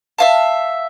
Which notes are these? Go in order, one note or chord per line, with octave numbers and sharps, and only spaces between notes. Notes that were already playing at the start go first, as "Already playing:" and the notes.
E5 F5 A5